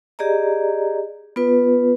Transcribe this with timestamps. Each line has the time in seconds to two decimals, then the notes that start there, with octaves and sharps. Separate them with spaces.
0.19 G4 G#4 D5 D#5 A#5
1.36 B3 F4 B4